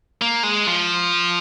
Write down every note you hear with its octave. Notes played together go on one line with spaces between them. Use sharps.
A#3
G#3
F3